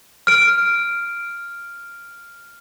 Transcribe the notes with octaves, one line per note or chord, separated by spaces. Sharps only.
F6 D7